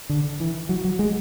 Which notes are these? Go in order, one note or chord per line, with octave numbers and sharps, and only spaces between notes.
D3
E3
F#3
F#3
G#3